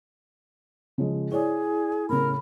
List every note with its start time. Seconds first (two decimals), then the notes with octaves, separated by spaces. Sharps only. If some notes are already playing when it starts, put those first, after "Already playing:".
0.98 C#3 F3 G#3
1.32 E4 G#4 C#5 D5
2.09 A2 C#3 A#4 B5